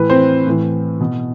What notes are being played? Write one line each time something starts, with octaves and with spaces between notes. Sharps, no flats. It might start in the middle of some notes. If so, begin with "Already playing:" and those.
Already playing: A2 E3 B4
C4 C5
A2 E3
B2